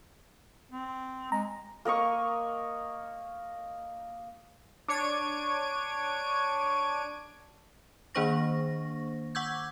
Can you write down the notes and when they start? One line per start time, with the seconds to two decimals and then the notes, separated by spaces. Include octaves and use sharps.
0.71 C4
1.32 G#3 A#5
1.85 A#3 A#4 D#5 C#6
4.88 D4 C#5 G#6 D7 D#7
8.15 D#3 A#3 D4 C5 C#6 A#6
9.35 F#5 C#6 D6 E6 G6 G#6